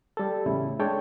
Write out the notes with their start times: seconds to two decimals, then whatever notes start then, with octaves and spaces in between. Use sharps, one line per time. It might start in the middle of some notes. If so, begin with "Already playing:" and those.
0.17 G3 A4
0.46 E2 A2 C#3 E4
0.79 G#3 D4 A4 C#5 G5